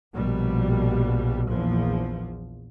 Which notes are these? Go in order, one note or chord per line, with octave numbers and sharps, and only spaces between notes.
A#1 B2 G3
A#1 E2 F3